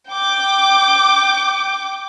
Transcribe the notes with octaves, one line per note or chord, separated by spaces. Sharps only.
G5 D6